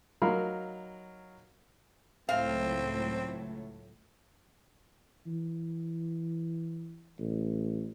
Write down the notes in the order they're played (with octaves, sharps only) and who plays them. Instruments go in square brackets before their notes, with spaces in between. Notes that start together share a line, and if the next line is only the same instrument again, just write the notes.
[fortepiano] F#3 D#4 A#4 F5 B5
[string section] C#2 A2 F#3 [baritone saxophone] C4 [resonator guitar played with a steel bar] F5
[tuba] E3
A1